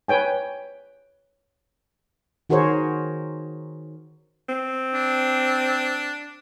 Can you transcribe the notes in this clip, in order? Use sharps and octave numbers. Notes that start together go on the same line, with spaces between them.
B4 C#5 G5 G#5
D#3 F#4 G#4 A#4 C5 C#5
C4
D4